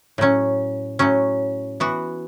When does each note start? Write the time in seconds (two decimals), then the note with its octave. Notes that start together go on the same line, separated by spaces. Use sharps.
0.18 A2 F#3 C#4
0.99 A2 F#3 C#4
1.80 E3 B3 F#4